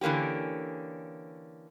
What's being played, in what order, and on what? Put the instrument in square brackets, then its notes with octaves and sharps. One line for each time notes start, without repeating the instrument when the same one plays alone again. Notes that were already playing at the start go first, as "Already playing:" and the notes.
[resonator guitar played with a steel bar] D3 E3 A#3 C#4 G4